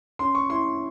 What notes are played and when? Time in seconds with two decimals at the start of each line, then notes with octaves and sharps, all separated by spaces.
0.19 C#4 C6
0.35 C#6
0.50 E4 C6